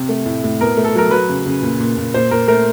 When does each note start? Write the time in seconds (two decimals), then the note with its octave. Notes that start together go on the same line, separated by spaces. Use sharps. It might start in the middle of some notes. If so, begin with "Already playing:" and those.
Already playing: C3
0.09 A3
0.26 A2
0.44 A2
0.60 B2 A#4
0.77 A3
0.84 A4
0.95 F#3 A#4
1.11 F#3 B4
1.29 C#3
1.46 C#3
1.62 A#2
1.80 A#2
1.97 A#2
2.14 A#2 C5
2.31 A#2 A#4
2.48 A3 A#4